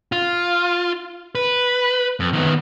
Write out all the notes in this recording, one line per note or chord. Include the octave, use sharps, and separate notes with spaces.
F4
B4
F2
D#3 B3